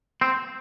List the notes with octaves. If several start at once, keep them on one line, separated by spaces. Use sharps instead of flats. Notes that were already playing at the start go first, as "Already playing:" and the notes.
C4